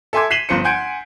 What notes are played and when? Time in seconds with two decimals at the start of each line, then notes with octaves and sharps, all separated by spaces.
0.13 A4 E5 G#5 C6 D6 G#6
0.30 B6 C7 D#7 E7 F#7 G7
0.49 G1 F3 C5 C#7
0.64 F#5 G#5 C6 G6 G#6 D7